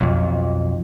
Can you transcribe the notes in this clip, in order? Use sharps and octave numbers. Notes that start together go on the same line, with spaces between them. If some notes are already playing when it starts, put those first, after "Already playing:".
B1 F2